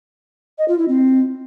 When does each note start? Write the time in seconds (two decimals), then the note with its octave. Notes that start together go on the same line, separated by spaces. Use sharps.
0.58 D#5
0.68 F4
0.78 E4
0.88 C4